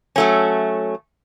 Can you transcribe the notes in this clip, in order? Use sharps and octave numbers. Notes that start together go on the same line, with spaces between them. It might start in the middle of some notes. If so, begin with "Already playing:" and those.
F#3 A3 C#4